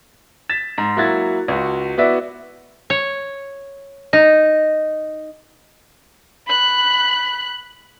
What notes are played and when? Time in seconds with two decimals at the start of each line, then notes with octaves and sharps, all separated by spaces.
0.49 A6 B6 E7
0.78 G#2
0.97 F#3 A#3 E4 F#4 G#6 A6
1.48 C#2 F#4
1.98 B3 E4 F#4 D5 E5
2.90 C#5
4.13 D#4
6.48 B5 F#6